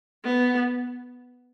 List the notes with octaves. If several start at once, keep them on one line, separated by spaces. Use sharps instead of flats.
B3